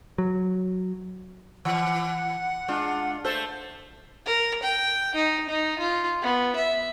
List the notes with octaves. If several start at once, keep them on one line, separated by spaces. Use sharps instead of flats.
F#3
E3 F#5
G#3 D4 F4
A3 A4 C5
A#4
G5
D#4
D#4
F4
B3
E5